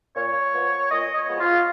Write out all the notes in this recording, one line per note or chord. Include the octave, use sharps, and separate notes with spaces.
A#2 C#5
F3 B3
A#2 D#5
C#5
F3 G#3 B3
F4